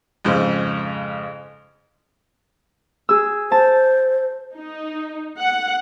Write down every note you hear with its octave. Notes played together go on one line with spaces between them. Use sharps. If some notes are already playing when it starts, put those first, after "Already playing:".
F2 G#2 C#3 C5
G#4 E6
C5 A5
D#4
F#5